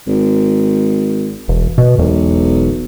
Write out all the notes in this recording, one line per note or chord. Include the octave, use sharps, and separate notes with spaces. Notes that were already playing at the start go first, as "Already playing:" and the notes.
G#1
E1
B2
E1 B1